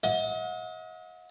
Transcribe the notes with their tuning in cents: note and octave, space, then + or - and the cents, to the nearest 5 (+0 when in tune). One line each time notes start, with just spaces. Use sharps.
D#5 +40 F#5 -40